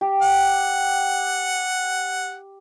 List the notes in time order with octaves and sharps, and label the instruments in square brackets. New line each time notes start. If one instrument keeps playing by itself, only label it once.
[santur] G4
[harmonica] F#5